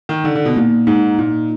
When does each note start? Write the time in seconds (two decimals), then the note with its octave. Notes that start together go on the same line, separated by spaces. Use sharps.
0.09 D#3
0.24 D3 D#4
0.35 D3
0.45 B2
0.56 A#2 A#3
0.87 G#2 D#4
1.19 A#2 A#3